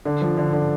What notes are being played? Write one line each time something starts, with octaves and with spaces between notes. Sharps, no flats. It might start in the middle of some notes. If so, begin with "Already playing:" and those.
D3
F3
D3
D3